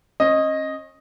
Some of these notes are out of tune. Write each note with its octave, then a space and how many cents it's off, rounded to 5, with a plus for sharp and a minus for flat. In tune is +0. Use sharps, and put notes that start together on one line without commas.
C#4 -35 D#5 +0